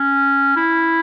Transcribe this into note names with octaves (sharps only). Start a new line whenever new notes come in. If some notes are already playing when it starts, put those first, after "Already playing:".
Already playing: C#4
E4